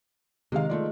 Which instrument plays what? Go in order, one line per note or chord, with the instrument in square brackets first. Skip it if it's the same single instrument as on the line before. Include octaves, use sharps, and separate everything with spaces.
[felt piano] C3 F5 [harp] D#3 G#3
[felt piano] A3 F4 D5